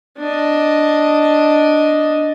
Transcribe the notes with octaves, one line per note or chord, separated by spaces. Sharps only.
D4 D#5